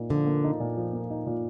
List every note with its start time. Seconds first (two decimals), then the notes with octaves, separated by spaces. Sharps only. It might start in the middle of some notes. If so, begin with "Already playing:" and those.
Already playing: A#2 A#3 D#4
0.10 D3 F3
0.27 A#3
0.44 D#4
0.60 A#2
0.77 F3
0.93 A#3
1.10 D#4
1.26 A#2